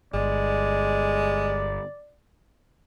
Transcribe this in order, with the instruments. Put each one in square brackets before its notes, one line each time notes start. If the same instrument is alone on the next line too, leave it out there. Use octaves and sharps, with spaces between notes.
[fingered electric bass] G1 [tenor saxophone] G#3 [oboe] D5